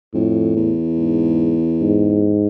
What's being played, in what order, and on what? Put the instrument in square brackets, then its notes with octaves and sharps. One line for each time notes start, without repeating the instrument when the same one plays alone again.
[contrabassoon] F2 [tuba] A2
[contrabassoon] E2
[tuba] G#2
G#2